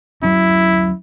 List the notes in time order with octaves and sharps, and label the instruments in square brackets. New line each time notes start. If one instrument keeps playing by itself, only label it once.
[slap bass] D2 F#3 C#4 [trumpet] E4